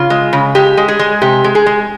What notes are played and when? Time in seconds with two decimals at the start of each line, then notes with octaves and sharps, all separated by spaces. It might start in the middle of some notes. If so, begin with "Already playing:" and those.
Already playing: C#3 F4
0.10 G#3
0.33 C#3
0.55 G#3 G4
0.77 G#3
0.88 G#4
0.99 G#3
1.22 C3 G4
1.44 G#3
1.55 G#4
1.66 G#3